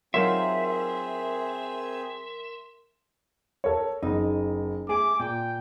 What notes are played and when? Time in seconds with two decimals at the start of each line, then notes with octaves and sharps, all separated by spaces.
0.14 F#3 C4 D#4 F4 G#4 A#4 E5 C6
3.64 A4 A#4 C#5
4.03 F#1 D#4
4.89 A3 G#4 G#5 D6
5.20 A#2 G5